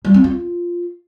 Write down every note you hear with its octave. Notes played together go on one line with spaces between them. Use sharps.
G3
C4
F4